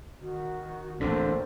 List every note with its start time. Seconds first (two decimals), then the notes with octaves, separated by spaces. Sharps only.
0.21 D#3 F#4
1.00 A1 D2 A#2 D3 A#3 C4 D4